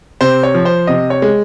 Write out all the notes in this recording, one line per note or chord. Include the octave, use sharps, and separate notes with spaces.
C3 C5
C#5
F3
C5
C3 D#5
C#5
G#3